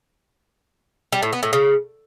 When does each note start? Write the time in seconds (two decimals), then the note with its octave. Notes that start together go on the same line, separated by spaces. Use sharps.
1.12 G3
1.23 A2
1.33 B3
1.43 A2
1.53 C#3